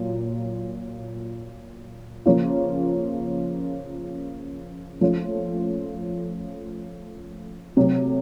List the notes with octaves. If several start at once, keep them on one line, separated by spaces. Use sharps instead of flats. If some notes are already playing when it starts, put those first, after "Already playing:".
Already playing: A#2 F#3 F4
C#3 F3 A#3 C#4 F4
F3 A3 C#4 F4
C3 F#3 A3